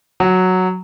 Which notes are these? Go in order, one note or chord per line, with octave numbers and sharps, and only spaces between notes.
F#3